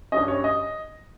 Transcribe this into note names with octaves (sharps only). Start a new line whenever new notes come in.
G2 G3 C#4 D#5
C#5
D#5